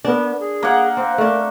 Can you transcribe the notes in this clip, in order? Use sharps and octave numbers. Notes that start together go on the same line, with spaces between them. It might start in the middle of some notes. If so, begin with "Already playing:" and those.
B3 D4 A#4
G#4
A#3 F#5
C4 C5
A3 D4 A#4